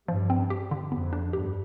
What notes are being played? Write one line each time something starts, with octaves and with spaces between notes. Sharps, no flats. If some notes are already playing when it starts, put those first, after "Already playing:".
G2 F3
C4
G4
D3
F2 B3
D4
G2 G4